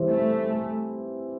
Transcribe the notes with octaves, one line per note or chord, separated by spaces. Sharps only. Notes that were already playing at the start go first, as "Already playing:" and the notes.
Already playing: E3 G3 C4 E4
A3